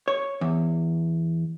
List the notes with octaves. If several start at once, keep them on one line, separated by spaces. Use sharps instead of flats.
C#5
E2